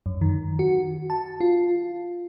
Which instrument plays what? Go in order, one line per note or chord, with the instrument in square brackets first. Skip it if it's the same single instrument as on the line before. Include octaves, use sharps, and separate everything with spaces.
[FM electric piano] F#2
D#3
F#4
A5
F4